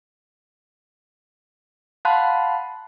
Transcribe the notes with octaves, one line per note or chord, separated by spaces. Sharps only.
F5 F#5 A5 B5 C6 F#6